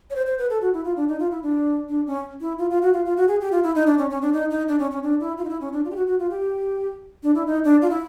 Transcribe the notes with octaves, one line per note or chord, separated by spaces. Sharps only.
C#5
C5
C5
B4
A4
F#4
E4
F4
D4
D#4
F4
E4
D4
D4
C#4
E4
F4
F4
F#4
F4
F4
F#4
G#4
G4
F4
E4
D#4
D4
C#4
C#4
D4
D#4
D#4
D4
C#4
C#4
D4
E4
F4
D#4
E4
C#4
D4
F4
G4
F#4
F#4
F4
G4
D4
E4
D#4
D4
F4
E4